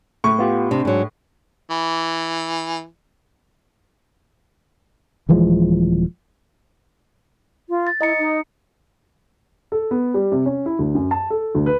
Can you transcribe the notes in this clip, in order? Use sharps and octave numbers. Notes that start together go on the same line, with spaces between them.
A2 C#6
B3 F4 G4
C3 D4
G#2 F#3
E3
D#1 E3 F3 G#3
F4
A6
E4 D#5 A#5 C#7
D#4
A4
B3
G3
C3
C#4
E4
D2
F#2
A5
A4
D2
B4